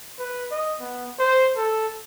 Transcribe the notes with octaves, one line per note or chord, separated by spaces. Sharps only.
B4
D#5
B3
C5
A4